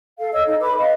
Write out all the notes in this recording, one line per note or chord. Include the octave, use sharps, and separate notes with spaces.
A4 F5
C#5 D#5 E6
D#4 A4 D#5
B4 B5 D6
B4 D#5 F5